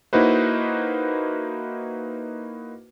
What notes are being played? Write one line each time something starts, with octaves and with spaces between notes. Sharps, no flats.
A#3 D#4 E4 F#4 B4 C5